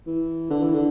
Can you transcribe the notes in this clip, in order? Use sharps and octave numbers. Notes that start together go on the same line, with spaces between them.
E3
D3
E3
D3